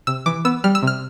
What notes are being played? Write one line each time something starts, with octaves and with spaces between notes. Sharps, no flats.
C3 E6
E3 D6
B3 E6
G3 F6
E6
C3 F6